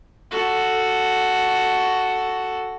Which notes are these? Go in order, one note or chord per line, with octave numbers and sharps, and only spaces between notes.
F#4 A4